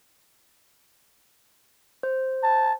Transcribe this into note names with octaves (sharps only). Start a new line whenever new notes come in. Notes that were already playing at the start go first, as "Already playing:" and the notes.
C5
A5